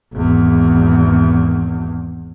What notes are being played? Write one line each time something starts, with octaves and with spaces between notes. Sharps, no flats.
G#1 E2